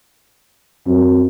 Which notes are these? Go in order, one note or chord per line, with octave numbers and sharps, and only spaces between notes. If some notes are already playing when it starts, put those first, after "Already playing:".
F#2 C4